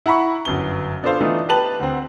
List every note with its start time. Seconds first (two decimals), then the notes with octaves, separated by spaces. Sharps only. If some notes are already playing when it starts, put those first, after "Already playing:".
0.06 E4 F#5 A#5 B5 C#6
0.45 G1 F#2 B3 G7
1.03 B3 D4 F4 A4 C5 F5
1.21 E3 A3 B3 D4 D#4 F4
1.48 G4 B4 A5 F#7
1.80 D2 C4